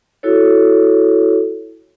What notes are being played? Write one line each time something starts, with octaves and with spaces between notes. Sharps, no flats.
E4 F#4 A4 C#5